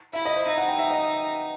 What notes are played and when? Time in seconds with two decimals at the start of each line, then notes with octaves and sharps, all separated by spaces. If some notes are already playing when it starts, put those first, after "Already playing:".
0.13 E4 E5
0.25 D#5
0.36 C5
0.47 D#4 E5
0.58 F#5
0.68 G5
0.79 E5
0.91 D#5